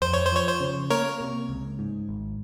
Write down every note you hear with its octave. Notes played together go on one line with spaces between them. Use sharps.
F2 C5
C#5
C5
F3 C#5
C5
C#3
A#3 A#4 C#5
C3
C#2
G#2
G#1